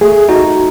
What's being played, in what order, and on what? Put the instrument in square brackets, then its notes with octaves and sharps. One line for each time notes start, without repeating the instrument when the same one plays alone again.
[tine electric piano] A3 [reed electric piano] G#4
[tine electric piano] D#4 [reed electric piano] F#4